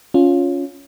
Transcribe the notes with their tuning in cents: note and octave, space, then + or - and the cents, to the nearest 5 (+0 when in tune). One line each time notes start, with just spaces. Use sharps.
C#4 +10 F4 +10